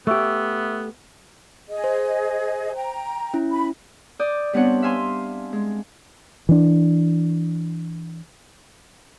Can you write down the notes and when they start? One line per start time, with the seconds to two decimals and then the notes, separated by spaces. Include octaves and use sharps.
0.07 A3 B3 G4 E5 C#6 E6
1.69 G#4 D#5
1.84 C5
2.75 G5 A#5
3.34 C#4 E4
3.50 B5
4.19 D5 D#6 G6
4.53 G3 B3 C4 D4 C#5 F#5
4.82 E5 F5 G#5 C6
5.53 G#3
6.49 E3 D4